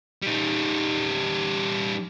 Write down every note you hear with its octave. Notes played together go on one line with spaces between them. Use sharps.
G3 D#4